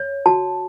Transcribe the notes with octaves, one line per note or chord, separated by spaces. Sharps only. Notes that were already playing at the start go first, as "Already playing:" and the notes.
Already playing: C#5
F#4 A5